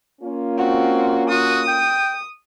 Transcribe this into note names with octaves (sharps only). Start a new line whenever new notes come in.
A#3 C#4 F4
C4 F#4
F#4 D#6
G5